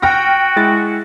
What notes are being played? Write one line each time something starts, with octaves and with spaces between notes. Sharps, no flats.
F#4 G5 F6 A#6
G#3 E4 A6